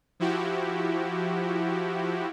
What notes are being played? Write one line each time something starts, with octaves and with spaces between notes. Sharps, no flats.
F3 E4 F#4 G4